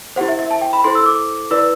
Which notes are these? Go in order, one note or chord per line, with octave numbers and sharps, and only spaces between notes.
E4 G4 C5 F#5
E5
E5
A5
G5
B5
E4 A4 C5 C6
E6
D6
E4 B4 D5 E6